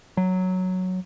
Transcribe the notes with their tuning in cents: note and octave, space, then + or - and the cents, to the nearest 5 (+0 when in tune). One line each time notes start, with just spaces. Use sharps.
F#3 +0